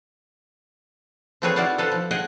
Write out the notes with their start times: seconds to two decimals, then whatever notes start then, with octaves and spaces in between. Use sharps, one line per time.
1.42 F3 A3 C4 G#4 B4 C#5
1.56 E4 F#4 D5 F5 F#5
1.78 A4 B4 C5 F5
1.92 F3
2.11 G#4 D#5 F#5 G5